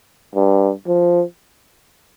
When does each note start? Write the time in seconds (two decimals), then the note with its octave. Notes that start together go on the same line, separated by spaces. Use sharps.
0.35 G2
0.87 F3